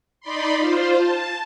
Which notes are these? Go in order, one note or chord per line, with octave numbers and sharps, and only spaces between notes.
D#4 D5 B5 C6
F4 C5
A5